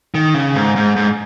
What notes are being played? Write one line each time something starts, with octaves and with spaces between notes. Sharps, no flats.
D#3
C#3
G#2
G#2
G#2